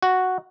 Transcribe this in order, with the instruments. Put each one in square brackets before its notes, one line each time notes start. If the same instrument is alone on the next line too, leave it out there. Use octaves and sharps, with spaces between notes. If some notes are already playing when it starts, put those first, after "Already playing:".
[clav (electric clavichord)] F#4